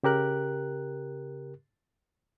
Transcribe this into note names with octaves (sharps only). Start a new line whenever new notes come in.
C#3 G4 A#4 F#6